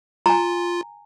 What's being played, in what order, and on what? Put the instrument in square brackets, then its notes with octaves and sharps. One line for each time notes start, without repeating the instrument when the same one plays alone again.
[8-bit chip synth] F4 [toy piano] G#5 A#5